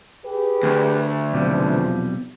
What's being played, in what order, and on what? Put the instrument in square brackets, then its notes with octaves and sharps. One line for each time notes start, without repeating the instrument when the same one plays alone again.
[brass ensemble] G4 G#4 B4
[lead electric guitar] D2
[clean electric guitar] B1 C3 G3 [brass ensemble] E2 F3